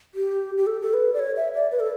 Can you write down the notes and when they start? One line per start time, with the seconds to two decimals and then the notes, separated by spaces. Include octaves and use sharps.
0.14 G4
0.57 G4
0.67 A4
0.82 A4
0.94 B4
1.14 D5
1.19 C#5
1.36 E5
1.54 D5
1.71 B4
1.80 A4